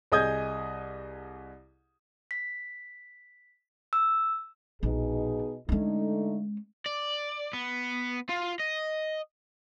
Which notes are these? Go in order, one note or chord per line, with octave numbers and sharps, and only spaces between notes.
C2 G#4 D#5 D#6 G6 G#6
B6
E6
A#1 B2 D4 D#4 G#4
D3 G#3 A3 C#4 D#4
D5
B3
F4
D#5